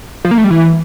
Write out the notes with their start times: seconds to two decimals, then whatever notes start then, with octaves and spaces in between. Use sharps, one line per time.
0.25 F3
0.31 A#3
0.38 A3
0.44 G3
0.50 E3